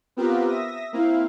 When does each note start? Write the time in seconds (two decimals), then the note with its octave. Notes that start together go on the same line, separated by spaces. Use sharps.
0.17 B3 C4 F4 G4 A#4 B4
0.48 E5 D#6 A#6
0.93 A#3 C4 E4 F5